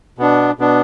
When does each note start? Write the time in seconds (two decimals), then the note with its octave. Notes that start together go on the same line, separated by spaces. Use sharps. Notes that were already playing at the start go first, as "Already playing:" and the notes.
0.18 B2 B3 D4
0.59 B2 B3 D4